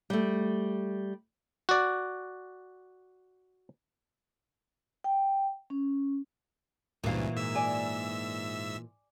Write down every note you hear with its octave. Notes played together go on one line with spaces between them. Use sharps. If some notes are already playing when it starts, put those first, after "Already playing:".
G3 A3
F#4 D5
G5
C#4
C#2 G2 A#2 E3 F#4 F5
G#2 E5 E6
D5 G#5